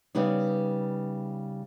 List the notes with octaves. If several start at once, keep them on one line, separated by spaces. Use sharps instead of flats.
C#3 G3 B3 D#4